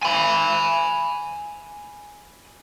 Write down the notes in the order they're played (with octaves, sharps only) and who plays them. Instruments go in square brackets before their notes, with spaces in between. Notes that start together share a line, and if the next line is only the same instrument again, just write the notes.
[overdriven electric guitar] G#5 B5